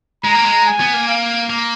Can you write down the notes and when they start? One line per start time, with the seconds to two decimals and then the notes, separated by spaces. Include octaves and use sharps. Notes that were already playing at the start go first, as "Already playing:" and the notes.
0.24 G#3 A#5
0.34 A#3
0.45 G#3
0.66 G#5
0.80 B3
0.94 A#3
1.08 F5
1.50 A#3